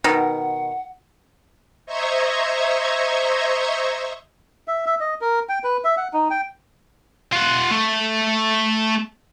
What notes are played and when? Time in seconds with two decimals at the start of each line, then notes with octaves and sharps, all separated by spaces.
0.04 B2 D#3 F#5
1.86 C5 D#5 E5 A#5 C#6 G#6
4.68 E5
4.86 E5
5.00 D#5
5.21 A#4
5.49 G5
5.64 B4
5.84 E5
5.97 F#5
6.13 D#4
6.30 G5
7.33 F4 F#5
7.71 A3